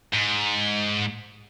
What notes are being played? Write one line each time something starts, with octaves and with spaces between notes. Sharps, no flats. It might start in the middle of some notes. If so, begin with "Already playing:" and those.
G#2